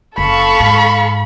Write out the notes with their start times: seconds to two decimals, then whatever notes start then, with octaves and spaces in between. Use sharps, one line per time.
0.18 F#1 A4 F5 B5 C#6
0.60 G#2